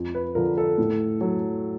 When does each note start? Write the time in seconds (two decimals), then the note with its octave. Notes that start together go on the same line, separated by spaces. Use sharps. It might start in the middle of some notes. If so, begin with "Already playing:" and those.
Already playing: F2
0.15 B4
0.35 D3 F3 A#4
0.58 A4
0.78 A2
1.21 F#3